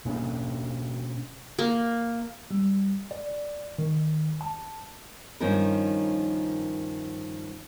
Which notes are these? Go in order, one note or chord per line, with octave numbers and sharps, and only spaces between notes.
B2 A#3 C#4 D4
A#3
G3
D5
D#3
A5
G2 D#3 F3 C#4 D#4 A#4